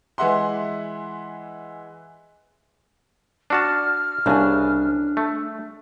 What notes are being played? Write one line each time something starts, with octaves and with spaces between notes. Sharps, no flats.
E3 G#3 E5 F#5 C6
D4 F#4 A5 F6
C2 C#3 D4 G#5
A3